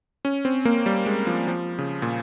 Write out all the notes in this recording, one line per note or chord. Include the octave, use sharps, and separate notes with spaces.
C#4
C4
A#3
G3
G#3
F3
F3
C#3
A#2